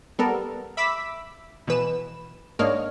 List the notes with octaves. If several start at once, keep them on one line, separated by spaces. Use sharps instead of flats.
G3 B3 A4 A#4
E5 B5 D6 E6 B6
B2 E3 B4 E7
G#2 A#3 D4 C#5 D#5 F6